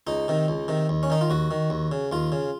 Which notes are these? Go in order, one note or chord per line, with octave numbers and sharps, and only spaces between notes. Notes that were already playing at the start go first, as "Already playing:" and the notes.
C#2 D#4
C3 D#3
C#2
C3 D#3
D#2
C#4
D#3 D#4
F4
D#2 F#4
D#3
D#2
C#3
D#2 F4
C#3